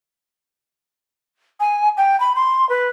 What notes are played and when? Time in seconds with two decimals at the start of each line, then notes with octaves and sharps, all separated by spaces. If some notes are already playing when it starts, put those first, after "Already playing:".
1.60 G#5
1.97 G5
2.20 B5
2.36 C6
2.69 B4